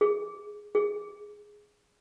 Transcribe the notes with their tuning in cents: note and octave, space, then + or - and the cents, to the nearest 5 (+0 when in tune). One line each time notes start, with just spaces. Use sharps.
G#4 +0
G#4 +0